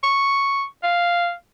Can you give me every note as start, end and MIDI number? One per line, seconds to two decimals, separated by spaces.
0.03 0.64 85
0.84 1.32 77